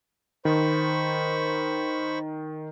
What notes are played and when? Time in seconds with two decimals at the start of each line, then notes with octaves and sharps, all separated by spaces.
0.45 D#3 C5 B5 C#6